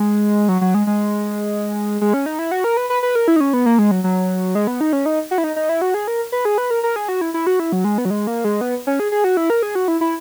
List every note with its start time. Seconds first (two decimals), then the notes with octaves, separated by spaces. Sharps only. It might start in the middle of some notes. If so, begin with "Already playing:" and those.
Already playing: G#3
0.49 F#3
0.61 F#3
0.74 G#3
0.87 G#3
2.01 G#3
2.14 C#4
2.26 D#4
2.39 E4
2.51 F#4
2.64 A#4
2.77 B4
2.90 B4
3.03 B4
3.15 A#4
3.28 E4
3.36 D#4
3.40 C#4
3.53 B3
3.66 A#3
3.79 G#3
3.91 F#3
4.04 F#3
4.55 G#3
4.67 B3
4.81 D#4
4.93 C#4
5.06 D#4
5.31 F#4
5.38 E4
5.44 D#4
5.56 D#4
5.69 E4
5.81 F#4
5.94 G#4
6.07 A#4
6.32 B4
6.45 G#4
6.58 B4
6.71 A#4
6.83 A#4
6.96 G#4
7.08 F#4
7.21 E4
7.34 E4
7.47 F#4
7.60 E4
7.72 F#3
7.84 G#3
7.98 B3
8.05 F#3
8.10 G#3
8.27 A#3
8.44 G#3
8.61 B3
8.87 C#4
9.00 G#4
9.12 G#4
9.24 F#4
9.37 E4
9.50 A#4
9.63 G#4
9.75 F#4
9.88 E4
10.01 E4